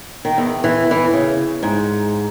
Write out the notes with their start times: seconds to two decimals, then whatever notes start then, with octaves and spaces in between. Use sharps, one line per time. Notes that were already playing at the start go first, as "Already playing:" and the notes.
0.25 D#3
0.38 E2
0.64 E3
0.91 E3
1.13 C#3
1.63 G#2